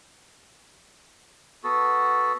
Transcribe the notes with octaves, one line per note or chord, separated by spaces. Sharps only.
B3 F#4 A4